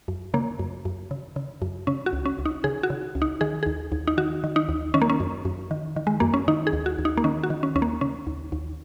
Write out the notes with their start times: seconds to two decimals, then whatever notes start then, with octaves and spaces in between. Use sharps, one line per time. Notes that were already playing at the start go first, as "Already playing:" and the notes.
0.08 F#2
0.34 C#3 A#3
0.59 F#2
0.85 F#2
1.11 C#3
1.36 C#3
1.62 F#2
1.87 C#3 C#4
2.06 F#4
2.13 C#2
2.25 C#4
2.39 C#2
2.45 D#4
2.64 C#3 G#4
2.83 F#4
2.90 C#3
3.15 C#2
3.22 D#4
3.41 D#3 G#4
3.63 D#2 G#4
3.92 D#2
4.07 D#4
4.17 D#3 F#4
4.44 D#3
4.56 D#4
4.69 D#2
4.94 D#3 C#4
5.02 A#3
5.10 C#4
5.20 F#2
5.45 F#2
5.71 D#3
5.96 D#3
6.07 G#3
6.20 F#2 A#3
6.34 C#4
6.48 D#3 D#4
6.67 G#4
6.73 D#2
6.86 F#4
6.98 D#2
7.05 D#4
7.17 A#3
7.24 D#3 C#4
7.43 F#4
7.50 D#3
7.63 C#4
7.75 D#2 C#4
7.82 A#3
8.01 C#3 C#4
8.27 D#2
8.52 D#2